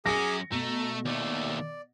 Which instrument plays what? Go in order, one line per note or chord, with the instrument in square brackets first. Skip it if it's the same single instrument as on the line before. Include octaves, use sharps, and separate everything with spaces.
[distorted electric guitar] F#2 C#4 [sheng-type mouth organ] G#4 D6 [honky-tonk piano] A#6 C#7
[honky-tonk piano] B2 [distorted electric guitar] A3 [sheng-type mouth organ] A#5
[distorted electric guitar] D#2 A3 [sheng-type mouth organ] D5